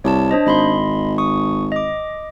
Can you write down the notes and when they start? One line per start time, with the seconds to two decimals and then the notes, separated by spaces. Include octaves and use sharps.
0.04 C2 C#5 A5
0.31 D4 C5 D#5
0.46 G#1 D#5 B5 C6
1.18 C#6 D#6
1.72 D#5 D6